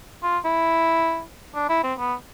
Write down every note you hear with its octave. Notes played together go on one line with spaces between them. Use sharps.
F4
E4
D4
E4
C4
B3